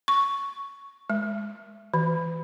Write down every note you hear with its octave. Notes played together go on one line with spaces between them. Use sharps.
C#6
G#3
E3